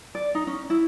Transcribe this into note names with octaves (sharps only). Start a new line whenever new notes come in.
D5
D#4
C#4
E4